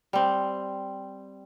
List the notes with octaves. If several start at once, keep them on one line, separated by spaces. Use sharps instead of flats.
G3 C4